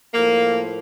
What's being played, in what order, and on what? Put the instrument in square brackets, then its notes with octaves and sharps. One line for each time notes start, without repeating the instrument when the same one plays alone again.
[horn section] A2 F3 A#3